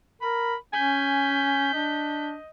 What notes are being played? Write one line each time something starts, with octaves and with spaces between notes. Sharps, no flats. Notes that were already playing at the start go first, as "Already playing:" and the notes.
A#4 B5
C#4 G#5 G6 B6
D4 D#5